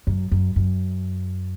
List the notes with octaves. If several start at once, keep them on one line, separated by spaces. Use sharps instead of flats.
F#2
F#2
F#2